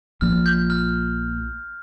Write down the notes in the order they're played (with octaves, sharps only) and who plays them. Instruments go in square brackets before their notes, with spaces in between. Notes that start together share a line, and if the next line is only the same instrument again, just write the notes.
[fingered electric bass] A#1 A#2 F3 [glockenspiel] F6
[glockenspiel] G6
F6